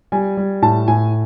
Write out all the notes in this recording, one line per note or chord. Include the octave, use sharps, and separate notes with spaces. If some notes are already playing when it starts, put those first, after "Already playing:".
G3 G#5
G3
A2 A5
A2 G#5